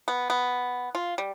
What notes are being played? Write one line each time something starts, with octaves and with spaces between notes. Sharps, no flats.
B3
B3
F4
G3